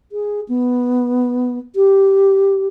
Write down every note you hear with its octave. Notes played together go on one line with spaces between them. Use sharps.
G#4
B3
G4